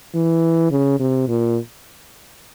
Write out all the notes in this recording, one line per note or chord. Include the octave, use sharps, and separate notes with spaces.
E3
C#3
C3
A#2